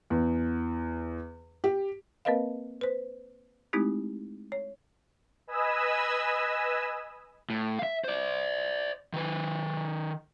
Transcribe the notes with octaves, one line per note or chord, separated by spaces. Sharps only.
E2
G4
A#3 C4 A#4 B4 D#5 F5
B4 C5
G#3 A3 C4 D#4 E4 G4
C#5
B4 D#5 G#5 B5 D#6 E6
A2
E5 F5
C5 D5
D#3 B4